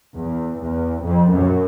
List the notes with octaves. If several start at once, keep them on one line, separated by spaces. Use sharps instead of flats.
E2
E2
F2
F#2